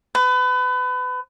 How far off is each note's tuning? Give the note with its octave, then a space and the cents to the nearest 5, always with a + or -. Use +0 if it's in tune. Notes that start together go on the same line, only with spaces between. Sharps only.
B4 +30